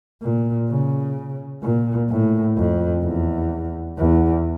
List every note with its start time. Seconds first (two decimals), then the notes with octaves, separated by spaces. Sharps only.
0.22 A#2
0.69 C#3
1.63 A#2
2.10 A2
2.57 F2
3.04 E2
3.98 E2